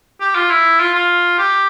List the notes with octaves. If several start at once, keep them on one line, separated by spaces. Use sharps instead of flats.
G4
F4
E4
F4
F4
G4